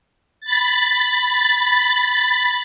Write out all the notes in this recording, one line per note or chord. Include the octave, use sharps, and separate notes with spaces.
B5 A6